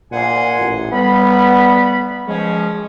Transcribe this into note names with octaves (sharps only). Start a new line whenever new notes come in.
A#2 F#5 G#5 C6
A1
G3 B3 B5
F3 G#3 C#4